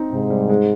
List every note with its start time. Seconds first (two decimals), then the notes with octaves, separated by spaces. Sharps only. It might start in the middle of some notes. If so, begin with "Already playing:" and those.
Already playing: C4 D#4
0.12 G#2 C3
0.30 G3
0.49 G#3